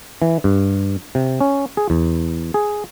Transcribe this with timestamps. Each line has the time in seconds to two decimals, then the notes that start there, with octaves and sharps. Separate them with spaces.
0.22 E3
0.44 G2
1.15 C3
1.41 C#4
1.77 G#4
1.90 E2
2.54 G#4